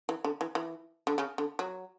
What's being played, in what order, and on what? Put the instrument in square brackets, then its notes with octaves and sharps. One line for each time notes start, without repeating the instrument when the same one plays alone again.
[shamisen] E3
D3
E3
E3
D3
C#3
D3
F#3